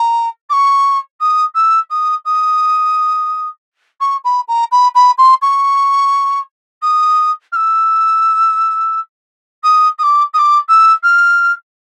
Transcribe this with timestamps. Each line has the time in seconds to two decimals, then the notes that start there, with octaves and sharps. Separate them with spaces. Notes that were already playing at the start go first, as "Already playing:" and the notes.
Already playing: A#5
0.49 D6
0.52 C#6
1.20 D#6
1.54 E6
1.90 D#6
2.25 D#6
4.00 C#6
4.24 B5
4.48 A#5
4.71 B5
4.95 B5
5.18 C6
5.41 C#6
6.82 D#6
7.52 F6
7.55 E6
9.63 D#6
9.98 D#6
10.03 D6
10.33 D#6
10.38 D6
10.68 E6
11.03 F6